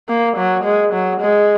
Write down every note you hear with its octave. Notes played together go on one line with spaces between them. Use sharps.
A#3
F#3
G#3
F#3
G#3